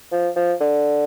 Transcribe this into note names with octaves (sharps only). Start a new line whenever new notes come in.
F3
F3
D3